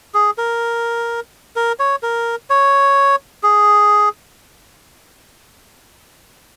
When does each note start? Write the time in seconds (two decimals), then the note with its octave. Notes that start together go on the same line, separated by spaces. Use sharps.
0.14 G#4
0.38 A#4
1.56 A#4
1.79 C#5
2.03 A#4
2.50 C#5
3.43 G#4